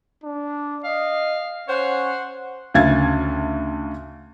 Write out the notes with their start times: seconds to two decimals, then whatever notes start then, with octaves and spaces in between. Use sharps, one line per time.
0.24 D4
0.84 D#5 F5
1.68 C#4 C5 C#5 F#5
2.74 D2 C#3 E5 F5 G#6 A6